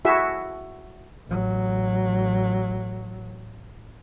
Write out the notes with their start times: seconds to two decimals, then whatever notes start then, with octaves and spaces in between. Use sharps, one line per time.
0.05 E4 F#4 G#4 E5
1.28 A1 F#3